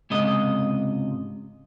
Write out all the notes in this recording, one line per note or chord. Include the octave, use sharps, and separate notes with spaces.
C#2 G#2 C3 D#5